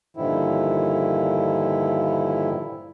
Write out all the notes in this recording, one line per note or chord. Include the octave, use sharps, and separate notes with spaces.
G2 A#2 D3 D#3 F3 E4